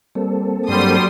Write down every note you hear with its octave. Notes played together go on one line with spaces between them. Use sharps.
G3 A#3 C4 A4
G2 F#3 G3 C6 D#6